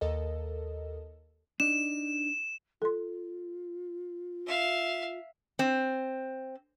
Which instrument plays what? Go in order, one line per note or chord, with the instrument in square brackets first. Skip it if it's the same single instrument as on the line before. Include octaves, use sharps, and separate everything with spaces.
[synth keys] D#2 A4 A#4 D#5
[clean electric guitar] D4 D#4 [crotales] E7
[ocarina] F4 [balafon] A4 C6
[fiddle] E5 F5
[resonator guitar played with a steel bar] C4